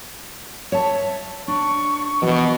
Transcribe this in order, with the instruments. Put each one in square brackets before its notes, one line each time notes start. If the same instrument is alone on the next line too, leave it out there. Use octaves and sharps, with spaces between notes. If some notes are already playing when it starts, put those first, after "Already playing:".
[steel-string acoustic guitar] C#5 E5 A5
[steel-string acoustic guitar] D4 [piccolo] C#6
[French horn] B2 [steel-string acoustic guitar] E3